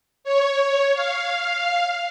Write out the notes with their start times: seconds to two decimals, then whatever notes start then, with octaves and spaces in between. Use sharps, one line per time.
0.24 C#5
0.94 F5